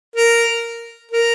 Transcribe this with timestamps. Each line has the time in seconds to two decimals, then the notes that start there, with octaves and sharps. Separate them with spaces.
0.16 A#4
1.11 A#4